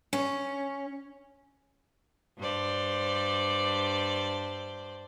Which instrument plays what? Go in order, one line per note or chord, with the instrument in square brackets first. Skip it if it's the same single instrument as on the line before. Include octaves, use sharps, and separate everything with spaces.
[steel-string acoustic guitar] C#4
[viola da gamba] G2 C5 D5